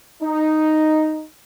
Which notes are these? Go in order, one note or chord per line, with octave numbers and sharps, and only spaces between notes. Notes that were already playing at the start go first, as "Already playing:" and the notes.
D#4